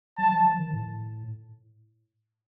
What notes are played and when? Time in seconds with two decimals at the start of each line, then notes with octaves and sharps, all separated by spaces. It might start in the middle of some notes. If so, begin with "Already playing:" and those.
0.18 F#3 A5
0.32 F3
0.46 F3
0.59 D#3
0.73 A2